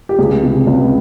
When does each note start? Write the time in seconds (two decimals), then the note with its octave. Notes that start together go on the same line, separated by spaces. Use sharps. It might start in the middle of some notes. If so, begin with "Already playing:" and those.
0.09 G4
0.19 C#2 G#4
0.43 C3
0.67 C#2